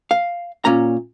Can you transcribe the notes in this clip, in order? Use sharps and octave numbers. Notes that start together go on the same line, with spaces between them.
F5
A#2 C#4 A#5